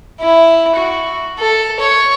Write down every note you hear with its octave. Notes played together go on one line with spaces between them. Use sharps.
E4
F#4
A4
C#5